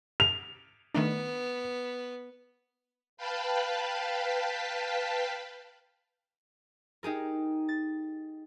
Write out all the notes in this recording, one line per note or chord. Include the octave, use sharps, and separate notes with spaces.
F7
D#3 A3 B3 D4
B4 F5 G5 A5 B5
D#4 G4 G#4 A#4
A6